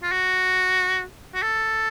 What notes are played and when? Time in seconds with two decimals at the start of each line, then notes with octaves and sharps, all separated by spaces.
0.03 F4
0.12 F#4
1.34 F#4
1.42 A4